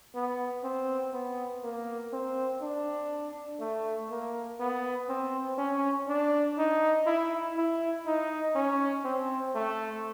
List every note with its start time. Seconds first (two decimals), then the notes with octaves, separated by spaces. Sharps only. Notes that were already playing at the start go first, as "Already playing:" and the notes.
0.15 B3
0.63 C4
1.13 B3
1.63 A#3
2.13 C4
2.62 D4
3.60 A3
4.11 A#3
4.60 B3
5.09 C4
5.58 C#4
6.08 D4
6.58 D#4
7.06 E4
7.56 E4
8.06 D#4
8.55 C#4
9.05 C4
9.55 A3